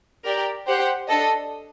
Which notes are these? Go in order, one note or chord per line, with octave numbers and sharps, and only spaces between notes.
G4 A#4 D5
G4 C5 F#5
D4 A4 D#5